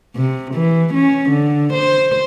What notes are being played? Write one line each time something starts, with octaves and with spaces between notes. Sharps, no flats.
C3
E3
C#4
D3
C5